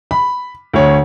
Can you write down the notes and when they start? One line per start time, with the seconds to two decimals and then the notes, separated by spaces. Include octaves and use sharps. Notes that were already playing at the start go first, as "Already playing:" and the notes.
0.11 B5
0.74 D2 C#5